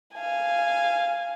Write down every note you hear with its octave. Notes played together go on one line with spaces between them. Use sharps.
F5 G#5